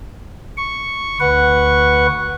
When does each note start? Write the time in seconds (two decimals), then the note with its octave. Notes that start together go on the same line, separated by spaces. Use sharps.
0.58 C#6
1.20 D2 B4 F#5 C#6